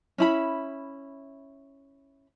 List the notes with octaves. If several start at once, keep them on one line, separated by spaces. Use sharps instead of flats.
C#4 E4 B5